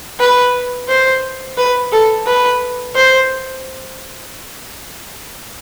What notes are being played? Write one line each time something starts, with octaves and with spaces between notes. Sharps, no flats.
B4
C5
B4
A4
B4
C5